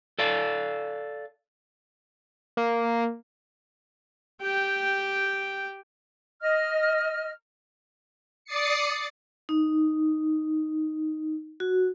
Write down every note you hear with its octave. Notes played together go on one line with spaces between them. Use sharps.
A4 D5 F5
A#3
G4 G5
D#5 F6
D5 D6 D#6 A6 C7 C#7
D#4
F#4